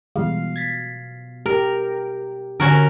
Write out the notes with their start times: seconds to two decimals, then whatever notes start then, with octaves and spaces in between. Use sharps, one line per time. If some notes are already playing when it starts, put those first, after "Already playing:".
0.16 B2 E3 G3 G#3 F5
0.56 G#6 A6 B6
1.46 G4 A#4
2.60 D3 C#4 F#4 A#4